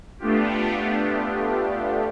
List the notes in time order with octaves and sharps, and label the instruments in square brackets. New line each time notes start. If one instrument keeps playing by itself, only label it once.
[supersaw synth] A3 B3 D4 F4 G4